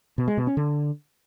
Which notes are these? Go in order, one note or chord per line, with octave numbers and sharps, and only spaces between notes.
B2
G#3
B2
C#4
D3